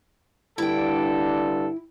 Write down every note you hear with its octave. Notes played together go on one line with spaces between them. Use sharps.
G2 D3 E4 A4 G5